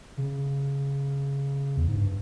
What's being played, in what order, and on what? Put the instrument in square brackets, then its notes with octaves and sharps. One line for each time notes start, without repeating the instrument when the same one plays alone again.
[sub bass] C#3
E2
G#2
G2